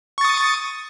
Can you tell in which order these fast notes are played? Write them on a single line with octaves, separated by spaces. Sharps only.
C#6 A6 D#6